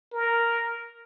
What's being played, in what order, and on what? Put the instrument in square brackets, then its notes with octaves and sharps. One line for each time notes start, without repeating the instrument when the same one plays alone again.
[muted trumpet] A#4